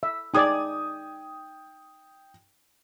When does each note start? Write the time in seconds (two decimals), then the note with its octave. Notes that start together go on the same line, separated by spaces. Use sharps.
0.03 E5
0.34 D#4 G#4 D5 G5 D#6 G#6